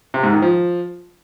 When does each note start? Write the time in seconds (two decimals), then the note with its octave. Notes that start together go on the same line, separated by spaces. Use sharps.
0.14 C3
0.23 G#2
0.33 D#3
0.42 F3